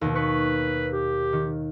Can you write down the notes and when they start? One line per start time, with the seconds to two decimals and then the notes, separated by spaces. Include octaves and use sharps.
0.01 D#2 B2
0.15 B4 C#6
0.92 G4
1.33 D#3